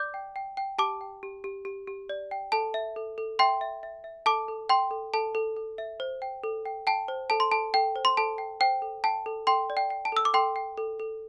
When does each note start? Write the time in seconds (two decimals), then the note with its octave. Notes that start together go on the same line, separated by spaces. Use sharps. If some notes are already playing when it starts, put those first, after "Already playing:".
Already playing: D5 D6 G6
0.14 G5
0.36 G5
0.57 G5
0.78 G4 A5 D6
1.01 G5
1.23 G4
1.44 G4
1.65 G4
1.87 G4
2.09 D5
2.31 G5
2.52 A4 A5
2.74 E5
2.96 A4
3.18 A4
3.39 E5 G5 C6
3.61 E5
3.83 E5
4.04 E5
4.26 A4 A5 D6
4.48 A4
4.69 G5 C6
4.91 A4
5.14 A4 A5
5.35 A4
5.57 A4
5.78 E5
6.00 C5
6.22 G5
6.44 A4
6.66 G5
6.87 G5 A5
7.08 C5
7.30 A4 A5
7.40 C6
7.51 A4 A5
7.74 A4 G5
7.96 C5
8.05 C6
8.17 A4 A5
8.38 G5
8.60 C5 G5
8.82 A4
9.04 G5 A5
9.26 A4
9.47 A4 G5 C6
9.70 D5
9.77 G5
9.90 G5
10.05 A5
10.12 A4 E6
10.25 D6
10.34 A4 G5 C6
10.56 G5
10.77 A4
11.00 A4